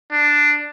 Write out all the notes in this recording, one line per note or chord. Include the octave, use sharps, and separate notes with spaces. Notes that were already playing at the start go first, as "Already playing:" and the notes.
D4